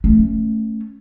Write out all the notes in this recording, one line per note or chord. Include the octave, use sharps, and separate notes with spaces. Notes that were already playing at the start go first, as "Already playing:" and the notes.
A3 C#4